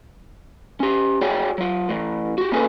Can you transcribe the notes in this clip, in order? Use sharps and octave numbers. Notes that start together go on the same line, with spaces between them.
C#4 G4
F#4 G#4 C#5 D5 G5
F#3 F4
A2 E3
F#4 G4
A#3 C#4 F#4 G#4 A4 B4